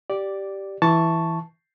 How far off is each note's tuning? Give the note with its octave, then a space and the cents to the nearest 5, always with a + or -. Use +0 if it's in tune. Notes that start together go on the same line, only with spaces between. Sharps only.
G4 -10 D5 +0
E3 +0 A5 +0 C#6 +0